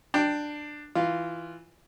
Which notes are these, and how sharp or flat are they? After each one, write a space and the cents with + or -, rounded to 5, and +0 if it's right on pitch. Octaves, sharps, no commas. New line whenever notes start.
D4 +10 G5 +0
E3 +0 F4 -10